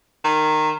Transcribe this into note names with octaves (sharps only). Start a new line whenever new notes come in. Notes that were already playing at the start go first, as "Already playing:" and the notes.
D#3